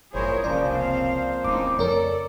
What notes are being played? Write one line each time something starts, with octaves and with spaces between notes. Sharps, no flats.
G1 F#2 A#2 E4 G#4 A#4 C5 C#5
D#1 C2 C#3 F3 A#3 C5 D5
C4 F5
D1 C#3 C4 D#4 E4 D6
F2 A4 A#4 C#5 D5